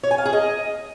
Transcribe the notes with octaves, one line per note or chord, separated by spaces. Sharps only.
C#5
G#5
F5
G#4
D#5